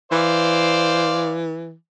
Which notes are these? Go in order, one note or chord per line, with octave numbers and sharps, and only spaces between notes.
E3 C5 D5 F5